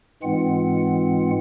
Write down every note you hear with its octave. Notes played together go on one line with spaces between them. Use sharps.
G#2 E3 G#3 C4 F4 F#5